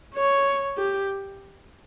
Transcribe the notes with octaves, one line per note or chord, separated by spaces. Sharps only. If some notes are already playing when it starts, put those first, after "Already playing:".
C#5
G4